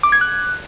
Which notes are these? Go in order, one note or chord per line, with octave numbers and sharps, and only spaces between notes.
D6
G#6
F#6